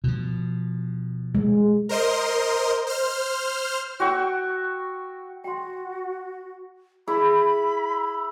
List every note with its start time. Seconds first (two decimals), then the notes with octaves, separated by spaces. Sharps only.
0.04 B2 F3
1.35 G#3
1.89 A#4 C5 D#5 C6
2.87 C5 F6
4.00 F#4 G5 C#6 E6
5.44 F#4 G5 C6
7.08 E4 G#4 B5